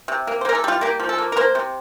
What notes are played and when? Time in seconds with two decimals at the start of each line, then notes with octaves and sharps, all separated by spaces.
0.08 C3
0.27 A#3
0.41 C5
0.45 A#3 A#4
0.55 A4
0.64 G3 F4
0.81 A#3 G4
1.00 F3
1.09 A4
1.18 A#3
1.32 A#4
1.37 A#3 C5
1.55 C3